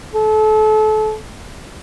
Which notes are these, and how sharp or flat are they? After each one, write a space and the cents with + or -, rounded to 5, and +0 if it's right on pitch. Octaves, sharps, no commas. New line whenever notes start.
A4 -30